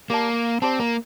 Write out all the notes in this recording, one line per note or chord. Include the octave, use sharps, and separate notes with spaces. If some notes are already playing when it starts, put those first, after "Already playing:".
A#3 G4 D5 A5
C4 G4 D5 A5
A#3